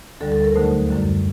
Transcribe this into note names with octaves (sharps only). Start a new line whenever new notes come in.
D2 D3 G3 A4
A4
A#4
D#2 D3 F#3 A3 D#4 C5
F#2 D3 G3